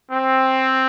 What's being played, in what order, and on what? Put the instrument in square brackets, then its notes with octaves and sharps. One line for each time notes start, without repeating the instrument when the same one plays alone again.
[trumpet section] C4